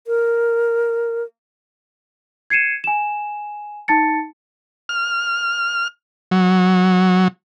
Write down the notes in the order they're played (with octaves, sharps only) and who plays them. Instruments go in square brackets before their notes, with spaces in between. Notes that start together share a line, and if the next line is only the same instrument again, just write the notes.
[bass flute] A#4
[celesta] G#6 C7 C#7 D#7 E7
G#5 E7
D#4 A5 A6 C#7
[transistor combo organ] F6
F#3